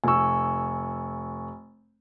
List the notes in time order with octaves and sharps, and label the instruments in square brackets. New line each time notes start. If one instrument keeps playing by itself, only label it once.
[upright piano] F1 E6 [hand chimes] G#5 C#6